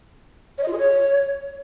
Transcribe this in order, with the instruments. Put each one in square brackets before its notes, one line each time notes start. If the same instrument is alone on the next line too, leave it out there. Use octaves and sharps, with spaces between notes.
[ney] C#5
D#5
F4
G#4
C#5